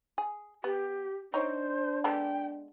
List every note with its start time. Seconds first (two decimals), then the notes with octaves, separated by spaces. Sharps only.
0.18 G#4
0.64 B3 G4
1.34 D4 D#4 C5 C#5
2.04 G#3 B3 A4 G5